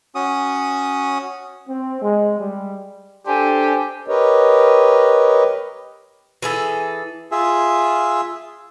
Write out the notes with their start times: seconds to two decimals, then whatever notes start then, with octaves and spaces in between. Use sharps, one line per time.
0.15 C#4 F#4 D#6
1.68 C4
2.02 G#3
2.39 G3
3.27 D4 G4 A4 C5 G#5
4.08 G4 A#4 B4 C#5 D#5
6.42 E3 G#4 A4
7.32 F4 G#4 E5